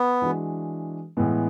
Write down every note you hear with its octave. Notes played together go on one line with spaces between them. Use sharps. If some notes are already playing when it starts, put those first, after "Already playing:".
Already playing: B3
E3 G#3 D4 F#4
A2 E3 G#3 B3